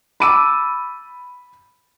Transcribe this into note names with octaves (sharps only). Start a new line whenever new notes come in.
A5 B5 D6 E6 D#7